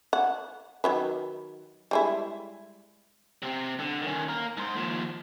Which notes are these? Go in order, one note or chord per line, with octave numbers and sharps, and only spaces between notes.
F#5
D#3 F#3 B4
G3 G#3 E4
C3 C4
D3
D#3 C#4
A#3 A#4
G#2 C5
D#2 F3